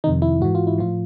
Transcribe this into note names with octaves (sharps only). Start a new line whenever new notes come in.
F2 C3 D#3 D#4
E4
G#2 E3 F#4
F4
E4
A2 F3 F4